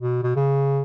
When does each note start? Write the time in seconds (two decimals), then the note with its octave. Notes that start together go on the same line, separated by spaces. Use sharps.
0.01 B2
0.23 B2
0.36 C#3